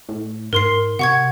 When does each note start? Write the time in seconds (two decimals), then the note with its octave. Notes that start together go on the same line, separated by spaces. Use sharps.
0.09 A2
0.53 G#2 A#4 C6 C7
0.99 C3 F#5 C#6 G#6